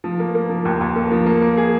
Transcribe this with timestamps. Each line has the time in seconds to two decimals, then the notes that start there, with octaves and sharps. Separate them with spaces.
0.04 F3
0.20 A#3
0.35 A#3
0.50 F3
0.65 D#2
0.81 D#2
0.96 A#3
1.11 F3
1.26 A#3
1.42 A#3
1.57 G#4